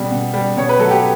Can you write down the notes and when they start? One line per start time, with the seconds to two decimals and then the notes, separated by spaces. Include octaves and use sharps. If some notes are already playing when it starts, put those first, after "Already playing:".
Already playing: B2 G3
0.11 B2
0.34 G3
0.56 B2 C#5
0.69 B4
0.79 F#3 A3 A4
0.91 G4